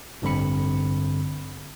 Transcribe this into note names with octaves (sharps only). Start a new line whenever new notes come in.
A1 G2 D3 C4 B5 C#7